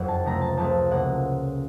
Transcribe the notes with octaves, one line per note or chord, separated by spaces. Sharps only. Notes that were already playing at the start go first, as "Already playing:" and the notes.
Already playing: F#1 F2 F#5
A5
C#2 C3 F3 A3 A#5
A5
C#2 C3 F3 A3 A5
A2 F3 A#3 F#5